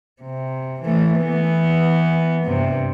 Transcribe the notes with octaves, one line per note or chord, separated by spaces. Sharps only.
C3
E3 A3
E3 B3
G2 C3